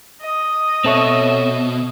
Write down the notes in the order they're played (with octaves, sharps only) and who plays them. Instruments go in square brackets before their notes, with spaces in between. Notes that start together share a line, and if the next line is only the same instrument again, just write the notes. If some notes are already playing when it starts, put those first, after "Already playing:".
[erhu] D#5
[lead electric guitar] B2 [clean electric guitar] C4 A4 C#5 [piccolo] E5